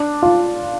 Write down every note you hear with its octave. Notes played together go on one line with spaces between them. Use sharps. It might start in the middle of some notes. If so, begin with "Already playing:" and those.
Already playing: D4
F4